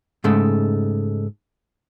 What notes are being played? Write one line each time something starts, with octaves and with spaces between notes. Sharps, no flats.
G#2 C#3 G#3 A3